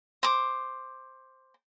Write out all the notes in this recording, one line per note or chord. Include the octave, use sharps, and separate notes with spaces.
C5 D6